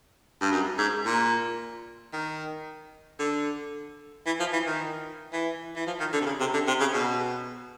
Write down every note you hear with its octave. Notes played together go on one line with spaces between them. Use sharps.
G2
F#2
G#2
A#2
D#3
D3
E3
F3
E3
D#3
E3
E3
F3
D#3
D3
C3
C#3
C3
D3
C3
C#3
B2